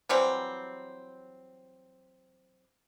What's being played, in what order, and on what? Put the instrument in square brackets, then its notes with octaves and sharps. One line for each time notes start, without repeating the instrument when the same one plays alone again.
[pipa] E3 F#3 G3 C4